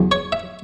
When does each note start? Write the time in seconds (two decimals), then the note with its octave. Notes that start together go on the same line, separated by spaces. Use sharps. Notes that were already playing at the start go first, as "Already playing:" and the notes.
Already playing: E2 C#3 F#3
0.11 C#5
0.32 E5